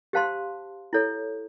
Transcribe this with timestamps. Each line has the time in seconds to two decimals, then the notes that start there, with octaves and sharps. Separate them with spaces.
0.13 G4 C5 F5 A5 C6
0.93 E4 A4 C#5